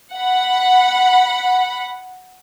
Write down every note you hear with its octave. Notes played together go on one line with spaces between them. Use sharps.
F#5 B5